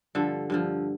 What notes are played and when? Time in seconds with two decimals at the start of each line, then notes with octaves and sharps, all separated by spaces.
0.15 G2 D3 F3 A4
0.50 G2 D3 F3